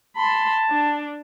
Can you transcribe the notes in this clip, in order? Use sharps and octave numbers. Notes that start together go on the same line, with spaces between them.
A5 B5 C6
D4